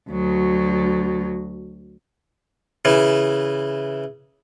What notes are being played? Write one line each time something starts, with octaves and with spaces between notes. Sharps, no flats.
D2 F#3
C#3 E3